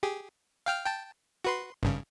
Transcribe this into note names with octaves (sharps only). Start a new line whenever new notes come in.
G4 G#4
F5 G5 F6
G5 A5
F#4 B4 C6
G#1 G2 C#3